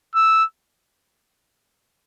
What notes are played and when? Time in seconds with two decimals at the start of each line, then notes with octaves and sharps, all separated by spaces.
0.15 E6